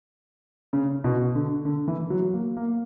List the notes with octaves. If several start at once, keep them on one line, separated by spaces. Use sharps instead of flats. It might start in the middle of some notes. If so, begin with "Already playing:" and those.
C#3
B2
D3
D3
E3
F#3
A#3
A#3